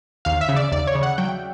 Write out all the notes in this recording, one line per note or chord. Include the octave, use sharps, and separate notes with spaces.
D#2 F5
E5
C#3
D5
D#2 D5
C#5
C#3
F#5
F#3 G5